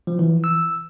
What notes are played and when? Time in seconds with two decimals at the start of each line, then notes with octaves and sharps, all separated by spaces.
0.07 F3
0.19 E3
0.44 E6